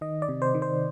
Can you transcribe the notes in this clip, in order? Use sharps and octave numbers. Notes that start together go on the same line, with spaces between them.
D#3 D#5
D5
C3
C5
D#3
C5